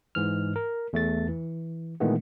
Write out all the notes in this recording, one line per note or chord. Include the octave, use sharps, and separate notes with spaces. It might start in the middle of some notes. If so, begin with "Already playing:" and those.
G#2 E3 F6
A#4
E2 A3 A6
E3
A#2 D#3 E3 G#3 A3 B3